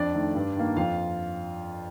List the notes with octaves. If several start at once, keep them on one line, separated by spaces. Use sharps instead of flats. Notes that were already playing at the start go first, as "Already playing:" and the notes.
Already playing: F2 D4 D5
D#3 A3
G2
D#3 A#3
F2 F4 F5